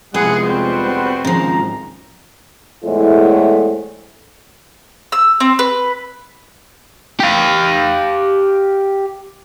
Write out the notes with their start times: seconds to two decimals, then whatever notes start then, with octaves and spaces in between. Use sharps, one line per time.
0.14 F1 F3 G#3 B3 E4 G#4 F#5
0.46 G3 C4 F#4 B4
1.25 G#1 C#3 F3 A#5
2.84 E2 A2 G#3 E4 A4 C5
5.12 E6
5.40 C4
5.59 B4
7.20 G4 F5